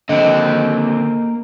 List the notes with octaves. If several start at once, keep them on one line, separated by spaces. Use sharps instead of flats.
D3 A#3 C4 D#5